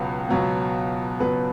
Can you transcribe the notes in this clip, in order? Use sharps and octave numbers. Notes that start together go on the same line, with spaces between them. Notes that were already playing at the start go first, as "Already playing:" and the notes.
Already playing: C#2 B2 F#3 B3
C#2 B2 F#3 B3
C#2 B2 F#3 B3 B4